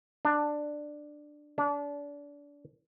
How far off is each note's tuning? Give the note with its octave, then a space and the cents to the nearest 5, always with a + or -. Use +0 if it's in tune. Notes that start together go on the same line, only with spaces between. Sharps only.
D4 +10
D4 -30